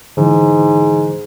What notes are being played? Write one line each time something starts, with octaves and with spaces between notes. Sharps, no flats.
G#2 D3 E3